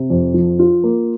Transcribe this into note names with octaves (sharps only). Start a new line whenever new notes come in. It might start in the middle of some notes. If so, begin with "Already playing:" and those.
Already playing: C3
F2
F3
F4
A#3